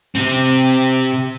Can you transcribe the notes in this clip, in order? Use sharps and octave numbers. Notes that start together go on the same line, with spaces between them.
C3 C4